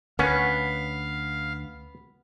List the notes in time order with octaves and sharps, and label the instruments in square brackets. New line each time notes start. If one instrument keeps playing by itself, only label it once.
[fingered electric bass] D2 [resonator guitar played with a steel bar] B3 [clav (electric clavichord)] C#4 [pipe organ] F5